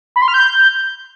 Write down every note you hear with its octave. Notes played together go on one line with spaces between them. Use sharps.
B5
C6
F6
G6